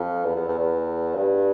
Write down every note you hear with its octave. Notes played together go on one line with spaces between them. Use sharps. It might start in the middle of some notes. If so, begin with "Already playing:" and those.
Already playing: F2
E2
E2
E2
E2
G2